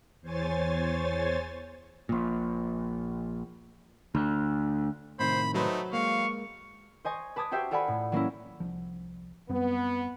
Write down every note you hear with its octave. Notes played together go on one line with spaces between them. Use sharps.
E2 C5 C#5 G#5 A6
A#1 A#2
D2
A2 C3 D#3 C5 B5
F#3 A3 D#4 B4 C5
G#3 A#3 F5 C#6
C5 D#5 G#5 C#6
B4 A5 D6 D#6 G#6
F#4 G4 C5 E5 G5 C#6
F4 A4 D5 F#5 G#5 B5
A2
F#3 A#3 C#4 E4
C2 F3
F#2 G3 B3 C4